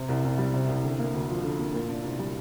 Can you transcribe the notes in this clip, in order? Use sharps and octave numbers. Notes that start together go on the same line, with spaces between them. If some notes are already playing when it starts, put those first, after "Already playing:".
Already playing: C3
C2
C2
G3
C3
C2
D3
A#3
D2
F3
D3
A#3
A#2
D4
C2
G3